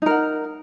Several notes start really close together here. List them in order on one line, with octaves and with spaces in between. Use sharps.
D#4 A#4 F#5